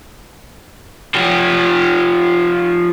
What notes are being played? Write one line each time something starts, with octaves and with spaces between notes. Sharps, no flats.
F3 G4